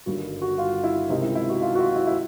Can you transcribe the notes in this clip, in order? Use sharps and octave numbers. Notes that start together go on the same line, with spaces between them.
G1 G2 D#3 F#4
F#4
F4
E4
C#2 C3 D#3 D#4
E4
E4
F#4
F4
F#4
F4
E4
E4